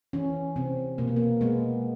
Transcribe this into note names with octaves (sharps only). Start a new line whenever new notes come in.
E3 C#4
C3 C4
B2 A#3
B3
A#3
G#3 B3